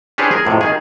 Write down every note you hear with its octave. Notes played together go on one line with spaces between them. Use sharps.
C#4 D4 G4 G#4 B4 C5
G#4 A#4
F2 A2 C3
D#3 G#4